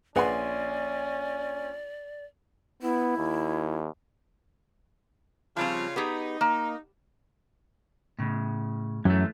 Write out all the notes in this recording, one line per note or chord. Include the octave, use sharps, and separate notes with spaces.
A#1 C#4 G#4 B4 D5 F#5 G#5 C6
B3 E4
D#2
C#3 F3 G3 C4 F4 C#5
B3 D#4 G4 G#4
A#3
A2 C#3
F#2 E3 A3